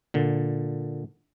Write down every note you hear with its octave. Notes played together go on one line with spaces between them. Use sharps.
A#2 D3